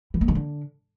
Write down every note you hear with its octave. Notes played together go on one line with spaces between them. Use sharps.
E3
A#3
D#3
D3